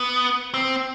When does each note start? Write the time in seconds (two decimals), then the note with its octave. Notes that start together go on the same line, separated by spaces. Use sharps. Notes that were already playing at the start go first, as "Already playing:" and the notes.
Already playing: B3
0.54 C4